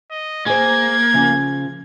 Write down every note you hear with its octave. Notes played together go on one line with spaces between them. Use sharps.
D#5
A#3 G#4 C5 G#6
C#3 F3